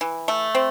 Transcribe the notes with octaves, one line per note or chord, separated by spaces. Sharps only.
E3
A3
C4